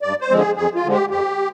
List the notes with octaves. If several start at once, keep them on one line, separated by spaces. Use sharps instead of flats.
G2 D5
C5
D3 F3 G#3 C4
G#4
F2 G#4
F4
D3 F3 G#3
G4
F2 G4